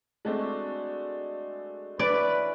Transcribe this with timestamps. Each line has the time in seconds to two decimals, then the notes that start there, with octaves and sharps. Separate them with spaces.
0.25 G#3 A3 C4 D4 F#4 D#5
1.99 E3 C#4 B4 D5